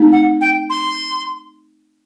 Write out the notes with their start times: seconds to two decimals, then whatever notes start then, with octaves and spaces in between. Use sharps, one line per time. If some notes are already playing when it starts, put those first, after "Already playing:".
Already playing: A3 C4 D#4
0.12 F#5
0.41 G5
0.70 C6